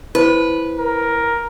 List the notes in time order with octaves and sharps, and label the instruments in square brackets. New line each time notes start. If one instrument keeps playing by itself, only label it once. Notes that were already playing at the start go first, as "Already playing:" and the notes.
[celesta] E4 C5 [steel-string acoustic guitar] B4
[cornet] A#4